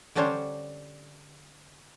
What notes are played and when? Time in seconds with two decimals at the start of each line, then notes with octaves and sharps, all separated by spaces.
0.15 D3 G3 C#4 D4 C5 C#5